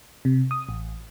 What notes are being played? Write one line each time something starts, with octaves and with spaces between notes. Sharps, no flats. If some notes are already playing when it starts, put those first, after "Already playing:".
C3
D#6
A1